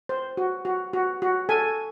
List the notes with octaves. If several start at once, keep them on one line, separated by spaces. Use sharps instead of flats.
C5
F#4
F#4
F#4
F#4
A4 G#5